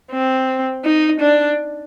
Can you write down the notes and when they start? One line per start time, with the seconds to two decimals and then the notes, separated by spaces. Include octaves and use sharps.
0.11 C4
0.84 D#4
1.20 D4